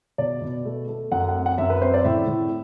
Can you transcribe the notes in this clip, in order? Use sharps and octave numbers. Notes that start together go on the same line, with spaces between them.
B2 D5
B2
A3
A3
F#2 F#5
F#5
C4
F#5
F#2 E5
B4
C4 C5
D5
A2 E5
A2